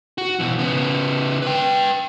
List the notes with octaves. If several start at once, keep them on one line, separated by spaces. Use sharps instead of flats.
F#4
B2 E3
C#3 B3
B4 G5